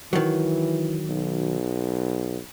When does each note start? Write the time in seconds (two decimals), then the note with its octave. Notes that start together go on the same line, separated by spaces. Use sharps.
0.13 D#3 E3 F#3
1.09 B1